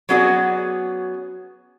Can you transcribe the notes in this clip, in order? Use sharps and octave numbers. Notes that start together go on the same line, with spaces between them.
F#3 B3 C#4 F#4 G#4 D5